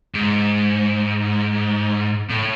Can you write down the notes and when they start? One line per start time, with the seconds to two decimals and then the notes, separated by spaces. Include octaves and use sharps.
0.14 G#2
2.30 A2